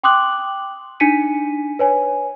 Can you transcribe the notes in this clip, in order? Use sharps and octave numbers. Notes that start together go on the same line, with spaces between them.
G5 C6 D6 D#6 F#6 F#7
D4 D#4 G#5 B6 C#7 D#7
B4 C#5 G#5